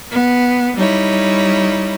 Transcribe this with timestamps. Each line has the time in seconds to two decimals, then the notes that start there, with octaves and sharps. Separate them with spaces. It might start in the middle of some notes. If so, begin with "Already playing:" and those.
0.11 B3
0.76 G3 D#4 E4 C#5